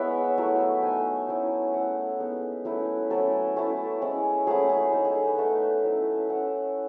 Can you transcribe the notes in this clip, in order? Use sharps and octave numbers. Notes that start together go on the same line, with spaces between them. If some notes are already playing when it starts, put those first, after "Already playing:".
Already playing: G#3 B3 E4 B4 C#5 E5 F#5
F#3 A3 E4
A3 D#4 G#5
F#3 C#4 E4
A3 C#4 E4 F#5
G#3 B3 D#4
F#3 A3 C#4 E4 B4
F#3 A3 C#4 E4 A4
A3 C#4 E4
G#3 C#4 E4
F#3 A3 C#4 E4 G#4
G#4
G#3 D#4 A4
G#4
A4
B4
A3 D#4 F#5
F#3 C#4 E4
A3 C#4 E4 F#5